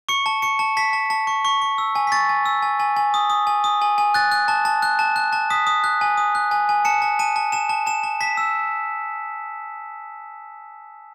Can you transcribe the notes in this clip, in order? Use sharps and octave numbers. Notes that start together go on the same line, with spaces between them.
C#6 C#7
A5
C#6 C#7
A5
A5 B6
A5
A5
C#6
C#6
C#6
E6
G#5
B6
C#6 A6
G#5
E6
G#5
G#5
G#5
D#6
D#6
G#5
D#6
G#5
G#5
F#6 A6
F#6
A5
A5
F#6
A5
F#6
A5
D#6 B6
D#6
F#6
G#5
D#6
F#6
G#5
G#5
A5 C#7
A5
A5 D#7
A5
A5 E7
A5
A5 E7
A5
A5 B6
E6